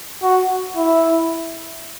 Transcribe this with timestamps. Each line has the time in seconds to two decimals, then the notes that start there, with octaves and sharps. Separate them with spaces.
0.23 F#4
0.76 E4